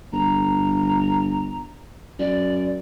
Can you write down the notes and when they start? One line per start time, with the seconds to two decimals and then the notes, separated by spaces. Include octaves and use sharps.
0.12 G1 A#5
2.19 F#2 D5